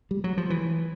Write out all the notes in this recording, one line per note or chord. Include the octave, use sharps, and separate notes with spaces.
G3
F#3
F3
E3